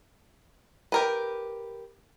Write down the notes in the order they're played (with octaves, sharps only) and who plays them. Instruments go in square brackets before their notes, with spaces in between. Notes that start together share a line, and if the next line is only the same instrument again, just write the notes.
[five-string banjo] G4 A#4 B4